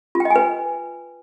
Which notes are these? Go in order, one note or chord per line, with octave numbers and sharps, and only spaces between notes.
F4
G5
D#5
G#5
B4